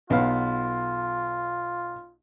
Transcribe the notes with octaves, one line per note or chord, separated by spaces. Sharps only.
B1 B3 F4 F5